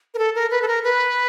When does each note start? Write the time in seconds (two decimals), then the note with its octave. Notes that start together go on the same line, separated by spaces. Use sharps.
0.14 A#4
0.18 A4
0.35 A#4
0.51 B4
0.62 A4
0.68 A#4
0.84 B4